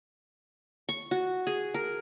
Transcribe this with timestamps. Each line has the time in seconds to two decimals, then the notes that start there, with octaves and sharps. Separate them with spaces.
0.89 C#6
1.11 F#4
1.47 G#4
1.74 A#4